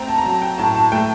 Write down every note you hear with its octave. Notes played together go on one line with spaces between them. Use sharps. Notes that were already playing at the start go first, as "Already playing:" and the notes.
Already playing: A3 C4 G5 A#5
A5
A#5
F#3 A5
G5
A2 A5
A5
A3 G5